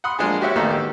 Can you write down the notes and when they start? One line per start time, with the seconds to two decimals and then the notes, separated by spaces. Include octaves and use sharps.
0.04 F#5 B5 C6 D#6
0.19 F3 G#3 A#3 D4 G#4
0.41 F#4 G4 C#5 E5 F#5
0.56 A1 A2 D#3 A#3 B3 A4
0.70 G4